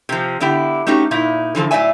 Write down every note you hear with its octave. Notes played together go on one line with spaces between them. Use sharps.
C3 F3
D3 B3 E4 G4 G5
A3 C#4 D#4 F#4 G4
A#2 D#4 E4
D3 E3 F3 A4
A2 F#3 D5 E5 G#5